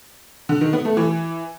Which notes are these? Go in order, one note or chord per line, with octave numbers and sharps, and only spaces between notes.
D3
D#3
B3
A3
E3